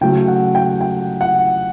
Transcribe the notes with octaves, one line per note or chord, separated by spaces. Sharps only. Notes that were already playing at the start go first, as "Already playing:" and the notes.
C#3 F#3 A3 G5
F#5
G5
G5
F#5